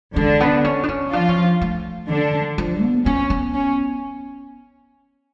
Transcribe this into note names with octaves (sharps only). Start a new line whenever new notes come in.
D3 G#3 D4
B3
C#4
D4
C#4
F3 D4 F4
C#4
A3
D3 D4
D3
F3
B3
B3 C#4
B3
C#4